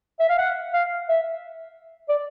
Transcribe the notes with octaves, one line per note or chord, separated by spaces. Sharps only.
E5
F5
F#5
F5
E5
D5